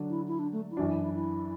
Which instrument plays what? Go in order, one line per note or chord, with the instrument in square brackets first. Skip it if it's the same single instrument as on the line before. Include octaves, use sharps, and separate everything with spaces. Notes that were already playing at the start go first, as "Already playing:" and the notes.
Already playing: [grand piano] D3 F#3 D4
[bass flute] E4
E4
D4
A3
E4
[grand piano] F#2 E3 D4 [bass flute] F#4
[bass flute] E4
E4
E4